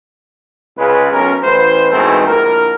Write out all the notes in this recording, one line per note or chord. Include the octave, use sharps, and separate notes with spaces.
C#2 C#3 G#3 G#4 B4
B1 C#4 A#4
A1 B4 C5
G#2 B2 D#3 E3 A3 C4
A#1 A2 D3 A#4